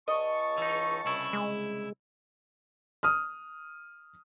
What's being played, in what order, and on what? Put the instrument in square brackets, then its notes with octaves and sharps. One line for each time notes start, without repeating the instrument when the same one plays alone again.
[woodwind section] C#2 A5 C#6 [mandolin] D#5
[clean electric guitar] E3 D#4
C2 C#3 E4
[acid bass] G#3
[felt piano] D#6 F6